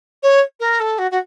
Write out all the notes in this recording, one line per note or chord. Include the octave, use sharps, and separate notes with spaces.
C#5
A#4
A4
F#4
F#4